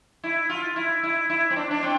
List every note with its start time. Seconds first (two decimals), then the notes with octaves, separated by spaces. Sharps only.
0.24 E4
0.49 F4
0.76 E4
1.03 E4
1.30 E4
1.50 C4
1.56 D4
1.71 D4
1.83 C4